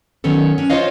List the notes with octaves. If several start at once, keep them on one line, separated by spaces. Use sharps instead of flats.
D#3 F#3 B3 C#4 A4
C#4 D4
F4 G#4 C5 C#5 D#5 F5